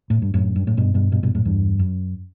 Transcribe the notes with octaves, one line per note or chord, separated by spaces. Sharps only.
A2
G2
F#2 A2
G2
A2
G2 B2
G2 B2
G2 B2
G2 B2
F#2 A2
E2 G2
F#2